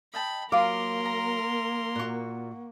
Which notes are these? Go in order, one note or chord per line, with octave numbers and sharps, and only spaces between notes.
D#5 G5 A5 B5
F#3 A#3 F4 A#4 F5 C6 D6
A#5
A#2 F#4 F#5 C#6